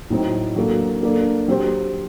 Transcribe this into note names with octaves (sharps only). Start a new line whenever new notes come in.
A2 F#3 C4 D#4
F#3 A#3 D4 A4
A#3 D4 A4
F#3 C4 G4 C5